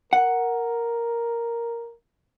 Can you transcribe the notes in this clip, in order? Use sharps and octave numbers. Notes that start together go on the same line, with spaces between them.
A#4 F#5